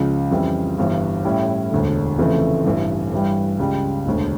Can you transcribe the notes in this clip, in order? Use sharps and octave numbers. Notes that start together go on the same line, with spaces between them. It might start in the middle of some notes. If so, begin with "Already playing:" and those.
Already playing: C#2 C#3 F3
F2 C#3 E3 G3
G1 G2 E3
A2 G3 C#4 E4
E1 D2 D3
F1 F2 C#3 E3 A3
A1 G2 E3
G2 E3 G3
C#2 C#3 G3
E1 D2 D3